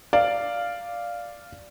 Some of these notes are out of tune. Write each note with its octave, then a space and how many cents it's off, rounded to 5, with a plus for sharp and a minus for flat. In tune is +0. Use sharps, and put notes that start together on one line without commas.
D5 +0 F5 -5